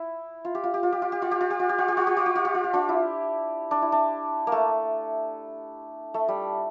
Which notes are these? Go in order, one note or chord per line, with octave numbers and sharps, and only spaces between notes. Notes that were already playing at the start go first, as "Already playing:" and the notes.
Already playing: E4
F4
G4
F4
G4
F4
G4
F4
G4
F4
G4
F4
G4
F4
G4
F4
G4
F4
G4
F4
G4
F4
G4
F4
G4
D4 F4
E4
D4
E4
D4
A#3
A3
A3
G3